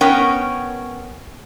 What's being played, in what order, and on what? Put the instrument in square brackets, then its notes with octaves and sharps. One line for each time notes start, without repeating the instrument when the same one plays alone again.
[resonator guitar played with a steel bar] B3 C#4 A#4 C#5 G5